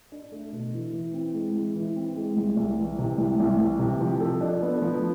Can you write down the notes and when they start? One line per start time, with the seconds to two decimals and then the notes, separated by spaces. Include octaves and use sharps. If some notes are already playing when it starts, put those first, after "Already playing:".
0.12 D4
0.32 A3
0.52 B2
0.73 E3
0.93 E3
1.14 C4
1.34 G#3
1.55 E3
1.75 E3
1.96 C4
2.16 G#3
2.37 C2
2.56 C2
2.78 E3
2.99 C3
3.18 C2
3.39 C2
3.60 E3
3.79 C3
4.00 F3
4.20 A4
4.41 D4
4.62 B3
4.82 F3